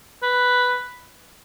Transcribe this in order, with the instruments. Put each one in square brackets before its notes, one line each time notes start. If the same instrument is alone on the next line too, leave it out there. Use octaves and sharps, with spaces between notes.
[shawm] B4